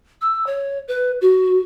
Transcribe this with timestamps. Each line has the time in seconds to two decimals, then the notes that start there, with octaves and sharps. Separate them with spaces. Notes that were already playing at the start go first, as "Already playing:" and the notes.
0.21 E6
0.47 C#5
0.88 B4
1.21 F#4